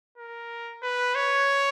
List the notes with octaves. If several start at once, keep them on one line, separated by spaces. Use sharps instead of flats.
A#4
B4
C#5